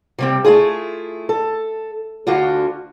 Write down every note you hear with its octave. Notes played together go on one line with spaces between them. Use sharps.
C3 G3 C4
A3 E4 F4 G#4
A4
D2 D3 F4 F#4